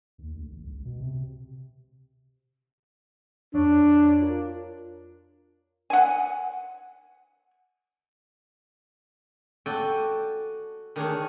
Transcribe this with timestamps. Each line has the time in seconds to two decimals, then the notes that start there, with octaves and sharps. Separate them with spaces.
0.18 D#2
0.35 D2
0.51 A1
0.62 C#2
0.85 B2
1.00 C3
3.54 F2 D4 C#5
4.22 F4 A#4
5.90 F#5 G#5
9.66 F#4 A4 D5 G5 G#5
10.96 D#3 D4 G#4 C#5